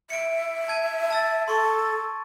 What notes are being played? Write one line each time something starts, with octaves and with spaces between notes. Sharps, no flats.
E5 C#7 D7
A5 G#6 D#7
A5 E6 A6
A4 C6 C#6